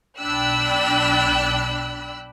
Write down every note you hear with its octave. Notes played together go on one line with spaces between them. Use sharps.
B1 D4 G5 B5 E6 F#6